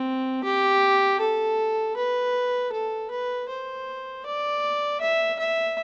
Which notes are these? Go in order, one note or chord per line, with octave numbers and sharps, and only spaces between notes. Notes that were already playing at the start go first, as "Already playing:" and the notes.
Already playing: C4
G4
A4
B4
A4
B4
C5
D5
E5
E5